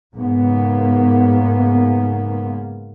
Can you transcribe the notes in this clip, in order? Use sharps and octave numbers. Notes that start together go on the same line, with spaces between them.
G#2 C#3 A#3 B3